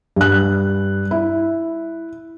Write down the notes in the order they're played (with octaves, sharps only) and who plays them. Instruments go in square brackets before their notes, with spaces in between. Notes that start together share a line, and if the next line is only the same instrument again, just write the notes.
[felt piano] G2 F#6
E4